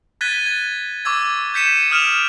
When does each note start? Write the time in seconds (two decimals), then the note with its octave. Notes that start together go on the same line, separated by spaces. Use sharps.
0.21 F#6 G#6 A6 B6 D#7 G7
0.46 G#6
1.05 C#6 D6 E6 G#6
1.54 G6 G#6 B6 C#7 D#7 E7
1.91 D#6 F6 D7 E7 F7